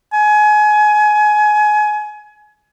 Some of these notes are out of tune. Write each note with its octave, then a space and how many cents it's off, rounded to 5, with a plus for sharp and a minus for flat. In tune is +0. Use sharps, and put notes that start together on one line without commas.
G#5 +25